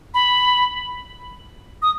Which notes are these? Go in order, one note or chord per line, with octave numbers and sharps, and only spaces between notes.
B5
D#6